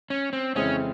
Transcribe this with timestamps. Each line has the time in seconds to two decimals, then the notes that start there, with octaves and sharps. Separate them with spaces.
0.10 C#4
0.33 C4
0.55 F2 C#3 E3 G#3 C4 C#4